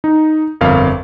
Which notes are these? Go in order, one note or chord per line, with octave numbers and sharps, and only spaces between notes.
D#4
G1 F2 A#4 F5